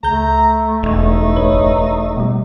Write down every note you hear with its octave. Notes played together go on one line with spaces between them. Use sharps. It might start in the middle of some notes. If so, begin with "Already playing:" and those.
C#2 A3 A#5 G6
E1 D#4
G1 B4 C#5
B2 G3